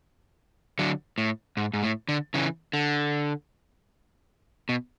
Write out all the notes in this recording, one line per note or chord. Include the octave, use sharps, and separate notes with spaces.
D3 F#3
A2
G#2
G#2
A2
D3
C#3 E3
D3
B2